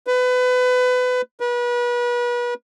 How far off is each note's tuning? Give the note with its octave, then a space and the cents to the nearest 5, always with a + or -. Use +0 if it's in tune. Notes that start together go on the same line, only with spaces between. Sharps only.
B4 +25
B4 -35